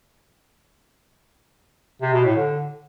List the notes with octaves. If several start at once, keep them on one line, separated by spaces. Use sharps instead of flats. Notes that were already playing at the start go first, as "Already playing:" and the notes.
C3
B2
A2
D3